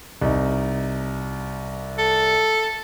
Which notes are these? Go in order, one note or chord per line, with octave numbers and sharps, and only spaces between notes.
C2 D#4
A4